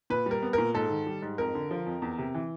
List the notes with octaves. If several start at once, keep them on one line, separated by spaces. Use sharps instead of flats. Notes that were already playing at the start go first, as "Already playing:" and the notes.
A#2 B4
G3 A#4
B3
A#2 A#4
G#2 A4
D#3
G3
G#2
F2 A#4
D3
F3
F2
E2
C3
E3